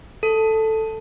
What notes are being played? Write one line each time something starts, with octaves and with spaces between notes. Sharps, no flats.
A4